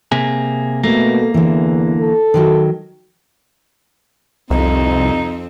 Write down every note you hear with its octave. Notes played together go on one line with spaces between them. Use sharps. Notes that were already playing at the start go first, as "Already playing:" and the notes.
C3 A#3 G#4
B2 A3 A#3
E2 D3 E3
A4
D#3 F3 F#3
C2 F2 C4 D#4